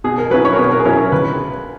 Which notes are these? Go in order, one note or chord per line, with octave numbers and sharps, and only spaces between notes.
B2 G#4
A#4
F#3 C#4 E4 B4
C#5
A#4
B2 B4
A#4
G#4
F#3 C#4 E4 A#4
A#4
C#2 B4